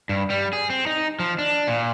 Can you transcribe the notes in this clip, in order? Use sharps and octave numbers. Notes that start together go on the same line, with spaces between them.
G2
G3
G#4
C4
D#4
F3
D4
A#2